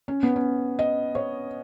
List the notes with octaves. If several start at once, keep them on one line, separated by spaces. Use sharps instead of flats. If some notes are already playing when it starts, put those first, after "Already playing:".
C#4
B3
C#4
D#5
C#5